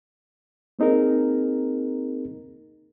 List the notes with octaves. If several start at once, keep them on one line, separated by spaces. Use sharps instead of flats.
A#3 C4 D#4 G#4 A#4